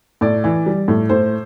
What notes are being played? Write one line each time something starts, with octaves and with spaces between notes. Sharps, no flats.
A2 D5
E3
G3
A2
A2 C5